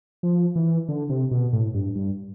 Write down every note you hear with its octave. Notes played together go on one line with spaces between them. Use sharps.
F3
E3
D3
C3
B2
A2
G2
G2